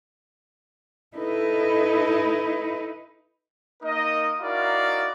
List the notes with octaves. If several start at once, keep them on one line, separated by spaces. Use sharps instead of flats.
D#4 E4 A4 B4 D#5
A#3 D#4 A#4 D#5
D#4 E4 F#4 A#4 D5 F5